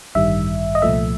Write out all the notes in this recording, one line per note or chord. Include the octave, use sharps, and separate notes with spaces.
A1 G2 D#3 G3 E5
D#5
C2 A#2 F3 A3 E5